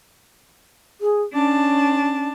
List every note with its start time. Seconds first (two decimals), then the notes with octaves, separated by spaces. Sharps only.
1.01 G#4
1.33 C#4 D4 A5